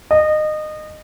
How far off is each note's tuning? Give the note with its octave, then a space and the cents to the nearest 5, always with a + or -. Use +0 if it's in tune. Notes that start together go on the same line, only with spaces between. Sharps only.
D#5 -25